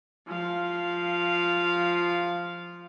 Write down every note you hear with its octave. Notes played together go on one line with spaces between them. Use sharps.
F3 F5